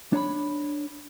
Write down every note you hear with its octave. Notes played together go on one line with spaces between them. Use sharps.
D4 C#5 A#5 B5